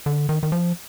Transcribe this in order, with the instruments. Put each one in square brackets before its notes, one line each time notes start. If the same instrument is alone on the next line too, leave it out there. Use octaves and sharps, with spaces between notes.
[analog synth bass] D3
D#3
D#3
F3